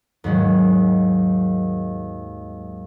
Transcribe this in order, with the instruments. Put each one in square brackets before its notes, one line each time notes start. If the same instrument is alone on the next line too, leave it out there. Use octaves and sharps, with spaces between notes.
[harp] D#2 G#2 F#3 G#3